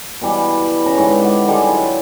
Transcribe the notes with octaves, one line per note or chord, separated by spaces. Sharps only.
B2 E3 G3
C#3 G3 A#5 B5
G#2 D3 B4 B5
G4 F#5
D3 D#3 G3 G#3
F#3 E4 F4